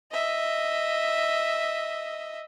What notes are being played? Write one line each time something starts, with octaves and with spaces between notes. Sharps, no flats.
D#5 E5